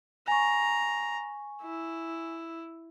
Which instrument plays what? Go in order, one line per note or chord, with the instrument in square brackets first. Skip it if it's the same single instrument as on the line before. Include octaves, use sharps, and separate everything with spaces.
[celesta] G#5 C#6 [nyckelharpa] A#5
[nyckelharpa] E4